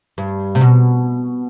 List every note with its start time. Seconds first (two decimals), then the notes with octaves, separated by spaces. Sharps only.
0.18 G2
0.55 C3
0.61 B2